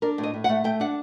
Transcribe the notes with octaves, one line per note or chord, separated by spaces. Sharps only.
D4 A#4
A2
D#5
A2
F#5
A3
A3 G5
D4 F#5